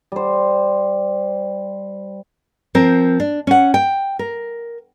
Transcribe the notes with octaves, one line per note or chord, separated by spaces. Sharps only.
G3 C5
F3 C4 A#4
D4
C#4 F#5
G5
A#4